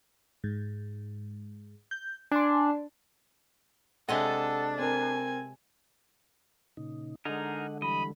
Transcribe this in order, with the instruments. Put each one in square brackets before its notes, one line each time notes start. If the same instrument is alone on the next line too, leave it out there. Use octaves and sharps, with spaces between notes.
[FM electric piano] G#2
G6
[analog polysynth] D4 [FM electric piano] G#5 C6
[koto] C3 G#3 D#5 [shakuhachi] D4 [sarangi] A4 [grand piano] F#5
[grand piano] C4 A#4 [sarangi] G#5
[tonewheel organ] A#2 C#3 D#4
[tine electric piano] D3 G#3 [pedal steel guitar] D#4 G#4 A#4 [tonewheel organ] D#5 F#5
[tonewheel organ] E3 G3 [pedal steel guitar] D#5 [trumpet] B5